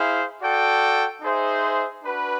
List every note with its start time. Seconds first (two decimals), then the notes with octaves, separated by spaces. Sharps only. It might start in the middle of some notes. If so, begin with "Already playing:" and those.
Already playing: E4 G#4 C5 F5
0.42 F#4 A4 D5 G5
1.21 D#4 G#4 C5 E5
2.03 D4 F#4 B4